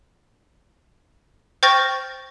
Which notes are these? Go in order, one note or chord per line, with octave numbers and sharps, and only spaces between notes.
C5 G5 C#6 F6 A6 A#6